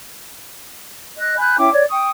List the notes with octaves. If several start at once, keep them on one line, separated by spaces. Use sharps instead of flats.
D#5 F#6
G#5 B5 F#6 G6
C#4 E4 G5 D6
C#5 D5
G5 C#6 D#6